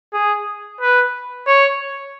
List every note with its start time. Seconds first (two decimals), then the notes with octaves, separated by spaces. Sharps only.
0.13 G#4
0.81 B4
1.47 C#5